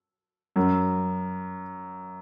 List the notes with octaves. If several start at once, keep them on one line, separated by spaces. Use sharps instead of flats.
F#2